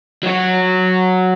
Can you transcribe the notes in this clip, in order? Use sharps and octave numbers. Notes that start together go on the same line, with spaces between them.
F#3 F#4